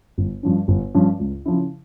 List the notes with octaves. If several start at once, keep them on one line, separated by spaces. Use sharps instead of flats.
G1
G2 F3 C#4
G1
G2 F3 C#4
C#2
C#3 F3 C#4 E4